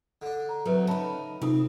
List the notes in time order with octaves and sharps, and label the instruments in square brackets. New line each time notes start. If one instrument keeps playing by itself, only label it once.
[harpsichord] D3 D4
[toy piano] A#5
[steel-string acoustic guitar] F#3 A3 C4 [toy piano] A4 B4 E5
[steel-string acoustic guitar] C#3 D#4 [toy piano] E5 A5 B5
[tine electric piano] C3 D#4 [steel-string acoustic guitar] C4 [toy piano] F4 A4 D#6